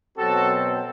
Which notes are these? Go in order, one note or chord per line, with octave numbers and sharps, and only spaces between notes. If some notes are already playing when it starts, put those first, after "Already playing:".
B2 F#3 C4 F#4 A4